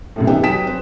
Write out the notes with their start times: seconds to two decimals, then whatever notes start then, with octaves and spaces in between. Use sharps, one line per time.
0.16 C2 F#2 A2
0.27 B3 D#4 G4 E5 G5
0.43 F#3 G5 D#6 B6 E7
0.67 C4 B4